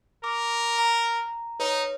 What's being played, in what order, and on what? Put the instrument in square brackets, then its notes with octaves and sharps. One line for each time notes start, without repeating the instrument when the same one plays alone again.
[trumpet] A#4 [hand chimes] D6
[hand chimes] A#5
[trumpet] D#4 [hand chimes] B4 C#5